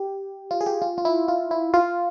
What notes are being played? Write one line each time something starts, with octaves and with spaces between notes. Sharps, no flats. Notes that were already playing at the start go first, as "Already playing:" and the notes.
Already playing: G4
F4
G#4
G4
F4
F4
E4
F4
E4
F4